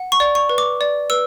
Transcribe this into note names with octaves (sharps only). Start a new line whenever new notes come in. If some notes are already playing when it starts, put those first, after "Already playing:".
Already playing: F#5
C#6
D5
C#6
B4
D6
D5
B4 E6